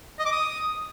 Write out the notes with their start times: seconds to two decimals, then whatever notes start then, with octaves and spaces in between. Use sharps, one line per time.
0.19 D#5
0.25 D6
0.32 D#6